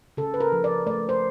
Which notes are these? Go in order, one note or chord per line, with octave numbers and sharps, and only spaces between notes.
C#3 A4
B4
A#4
F3
D5
A3 D5
C5